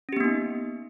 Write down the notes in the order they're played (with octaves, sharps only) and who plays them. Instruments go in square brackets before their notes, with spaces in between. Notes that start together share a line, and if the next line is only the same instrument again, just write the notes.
[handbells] C#4
G4
B3
A#3
D#4